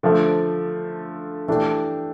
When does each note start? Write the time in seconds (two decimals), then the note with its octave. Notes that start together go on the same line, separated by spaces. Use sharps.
0.03 D3 F3 A3
1.48 E3 A3 D4 G4